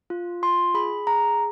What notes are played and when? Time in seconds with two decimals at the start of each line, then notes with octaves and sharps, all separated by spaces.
0.10 F4
0.42 F4 C6
0.74 G#4 B5
1.07 G#4 A#5